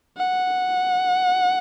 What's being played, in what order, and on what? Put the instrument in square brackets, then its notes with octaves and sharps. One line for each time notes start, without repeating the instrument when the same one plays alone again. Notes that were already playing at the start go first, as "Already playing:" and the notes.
[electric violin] F#5